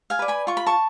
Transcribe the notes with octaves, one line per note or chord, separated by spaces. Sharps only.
F5 G#5
B4 D5
G#5 B5
F4 C#6
B5
A5 C#6